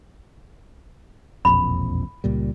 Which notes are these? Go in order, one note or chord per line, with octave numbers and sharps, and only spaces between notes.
E1 A#1 F2 B5
C#2 A#2 G3